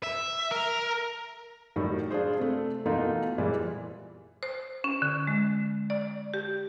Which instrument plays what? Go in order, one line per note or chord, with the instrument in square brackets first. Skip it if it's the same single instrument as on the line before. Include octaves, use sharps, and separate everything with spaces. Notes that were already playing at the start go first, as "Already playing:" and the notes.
[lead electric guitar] E5
A#4
[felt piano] A2 D#3 F#3 G3
D4 F4 G#4 C5
C3 A3
B2 E3 A3 A#3 D#4 F4
A#2 E3 G3 G#3
[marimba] C5
C#4
D3
G#3
D5
G4